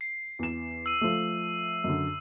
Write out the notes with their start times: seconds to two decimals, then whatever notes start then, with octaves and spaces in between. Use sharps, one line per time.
0.01 C7
0.39 E2 E7
0.86 E6 D#7
1.01 F3 A3
1.84 F#2 D3